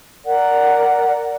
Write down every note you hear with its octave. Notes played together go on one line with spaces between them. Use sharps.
A#4 D5 F#5